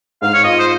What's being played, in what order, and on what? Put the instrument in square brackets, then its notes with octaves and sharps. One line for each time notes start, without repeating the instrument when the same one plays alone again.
[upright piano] G#2 [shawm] F5
[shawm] C#5
[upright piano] F4 [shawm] D#5
[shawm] C5